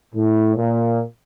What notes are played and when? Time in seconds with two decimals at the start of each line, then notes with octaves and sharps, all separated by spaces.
0.15 A2
0.56 A#2